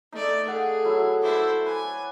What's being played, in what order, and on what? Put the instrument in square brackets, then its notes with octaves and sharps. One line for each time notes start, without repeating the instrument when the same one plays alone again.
[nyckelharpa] A3 D5 [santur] D#4
[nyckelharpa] G#4 [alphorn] A4 [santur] F5 F#5
[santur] F#3 E4
[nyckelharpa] E4 C5 [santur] D5
[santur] B4 [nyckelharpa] G#5